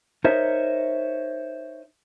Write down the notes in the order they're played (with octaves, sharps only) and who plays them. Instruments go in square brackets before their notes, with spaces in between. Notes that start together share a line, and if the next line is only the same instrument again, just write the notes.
[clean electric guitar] D#4 A#4 C5 C#5 D#5 E5